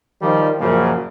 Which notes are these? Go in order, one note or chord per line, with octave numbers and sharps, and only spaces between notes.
D#3 F3 G3
F#2 A#2 C#3 F3 F#3 A#3